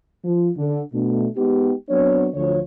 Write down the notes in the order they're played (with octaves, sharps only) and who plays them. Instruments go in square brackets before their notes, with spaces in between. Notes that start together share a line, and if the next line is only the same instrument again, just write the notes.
[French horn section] F3
D3
B2 A3 D4
G#3 B3 D#4 G4
F#3 B3 C4 D4 C#5
D2 D3 F3 C#5